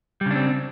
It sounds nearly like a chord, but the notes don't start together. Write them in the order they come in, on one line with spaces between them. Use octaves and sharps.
G3 C#3 D4 C4